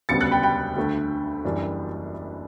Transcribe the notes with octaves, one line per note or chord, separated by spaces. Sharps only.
E1 D2 C#3 G3 B3 A6 C#7
F#6 A6
G5 B5
G5 B5
D2 D3 A3
F#1 F#2 E3 G3 D4